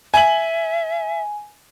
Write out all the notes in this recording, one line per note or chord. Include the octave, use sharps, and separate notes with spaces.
E5 G#5 F#7